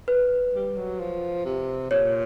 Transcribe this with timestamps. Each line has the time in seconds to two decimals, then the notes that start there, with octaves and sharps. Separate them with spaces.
0.08 B4
0.53 G3
0.77 F#3
0.99 F3
1.45 C3
1.91 A#2 C#5